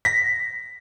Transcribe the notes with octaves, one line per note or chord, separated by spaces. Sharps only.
A#6 B6